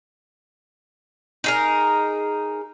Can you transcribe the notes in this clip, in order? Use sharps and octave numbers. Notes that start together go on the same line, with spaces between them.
D#4 G#4 A#4